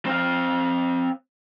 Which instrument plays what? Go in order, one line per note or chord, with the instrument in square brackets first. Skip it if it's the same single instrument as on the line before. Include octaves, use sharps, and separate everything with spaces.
[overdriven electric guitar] C4 F5